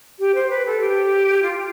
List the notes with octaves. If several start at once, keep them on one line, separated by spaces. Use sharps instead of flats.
G4
C5
B4
A4
G4
F4